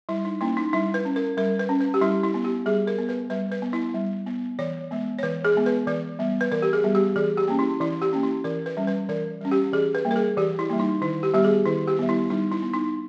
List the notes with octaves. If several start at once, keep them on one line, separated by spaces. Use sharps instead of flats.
G3 E4
D#4
A#3 C#4 E4
D#4
G3 E4
B4
C#4
A#4
G3 A#4
B4
C#4
B4
G4
G3 E4
E4
B3
G4
G3 G#4
A#4
B3
B4
G3 B4
B4
B3
E4
G3
B3
E3 C#5
G#3 B3
C#5
E3 B4
G#4
G#3 B3
B4
E3 B4
G3 B3
B4
E3 A#4
G4
G#4
G3 B3
G4
E3 G#4
G4
A#3 C#4
E4
E3 E4
G4
A#3 C#4
E4
E3 A#4
B4
G3 C#4
B4
E3 A#4
G3 C#4
G4
E3 G#4
B4
G3 A#3
A#4
G#4
E3 G4
E4
G3 A#3
D#4
D#3 E4
G4
G3 B3 G4
G#4
D#3 E4
G4
G3 B3
E4
G3 D#4
E4
B3
D#4